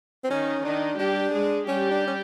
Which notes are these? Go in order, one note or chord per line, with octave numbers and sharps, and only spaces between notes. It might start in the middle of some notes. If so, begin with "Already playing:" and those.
C4
D#3 C#4 D#4
D#3 D4 D#4
G3 D4 G4
G#3 G#4
G3 C#4 G4
D4
C#4